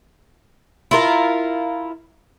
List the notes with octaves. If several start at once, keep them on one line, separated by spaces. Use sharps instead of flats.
E4 F4 A#4